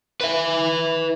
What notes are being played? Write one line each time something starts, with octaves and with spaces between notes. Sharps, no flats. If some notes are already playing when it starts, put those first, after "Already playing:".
B4 E5